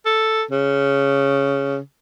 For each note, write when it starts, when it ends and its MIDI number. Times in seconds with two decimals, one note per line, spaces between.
0.06 0.44 69
0.51 1.79 49